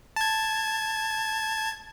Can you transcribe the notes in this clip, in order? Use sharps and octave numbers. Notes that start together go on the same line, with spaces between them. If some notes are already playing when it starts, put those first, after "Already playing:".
A5 G#6